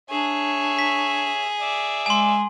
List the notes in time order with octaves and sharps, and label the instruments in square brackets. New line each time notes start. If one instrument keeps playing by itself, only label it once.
[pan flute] D4 [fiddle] G#4 [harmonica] C#5 E5
[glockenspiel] B6
[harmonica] D5 E5
[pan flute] G#3 [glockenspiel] G#5 C6